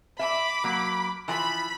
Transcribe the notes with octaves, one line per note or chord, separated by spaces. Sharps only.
E5 B5 D6
F#3 A#3
E3 F3 B5